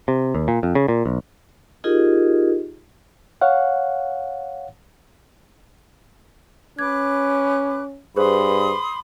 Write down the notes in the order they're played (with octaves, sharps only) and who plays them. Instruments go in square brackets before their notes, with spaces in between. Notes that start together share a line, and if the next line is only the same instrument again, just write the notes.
[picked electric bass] C3
D#2
A#2
F2
C#3
A#2
B1
[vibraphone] D#4 F4 G4 G#4 A#4 D#5
[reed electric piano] C#5 F5 F#5
[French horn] C#4 [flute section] B4 D6 F#6 [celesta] G#6
[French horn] G2 [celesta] G#4 B4 C5 [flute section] B5 C6 D#6